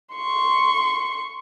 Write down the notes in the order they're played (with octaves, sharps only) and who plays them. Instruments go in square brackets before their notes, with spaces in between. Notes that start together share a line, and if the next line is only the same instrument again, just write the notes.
[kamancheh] C6 C#6